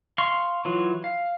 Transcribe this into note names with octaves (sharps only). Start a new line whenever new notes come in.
F5 C6 C#6
E3 F#3 F4
F5